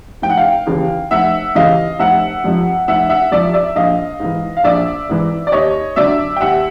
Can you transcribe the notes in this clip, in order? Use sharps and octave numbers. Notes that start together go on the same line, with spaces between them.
F1 G5
F#5
F5 G5
D#2 C#3 E3
F1 E5 F#5
D#2 C#3 E3 D#5 F5
F1 E5 F#5
F2 C3 F3
F1 E5 F#5
E5 F#5
F2 C3 F3 D5 E5
D5 E5
A#1 D#5 F5
G#2 E3
F5
A#1 D5 E5
G#2 E3
D5
D#2 C#5 D#5
D3 F#3 D5 E5
G5
D#2 E5 F#5